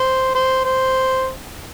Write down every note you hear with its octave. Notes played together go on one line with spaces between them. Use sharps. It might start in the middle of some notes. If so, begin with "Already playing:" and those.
Already playing: C5
C5
C5